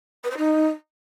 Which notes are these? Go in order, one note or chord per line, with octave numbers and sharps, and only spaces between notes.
B4
C5
D#4